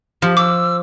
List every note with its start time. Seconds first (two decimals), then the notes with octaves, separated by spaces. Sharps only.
0.22 F3 G4
0.37 D6 E6